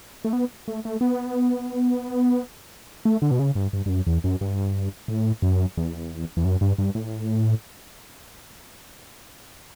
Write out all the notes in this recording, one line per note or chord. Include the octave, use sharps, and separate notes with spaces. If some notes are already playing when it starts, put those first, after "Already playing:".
A3
B3
A3
A3
B3
A3
D3
B2
C#3
G2
G2
G2
F#2
E2
F#2
G2
A2
F#2
E2
E2
F#2
G2
G2
A2